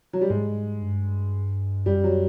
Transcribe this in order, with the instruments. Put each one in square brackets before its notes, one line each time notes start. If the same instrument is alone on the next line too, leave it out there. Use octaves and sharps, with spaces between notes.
[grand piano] F#3
G3
[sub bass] G#2 [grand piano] G#3
[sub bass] G2
[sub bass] F#2 [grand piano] G3
[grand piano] F#3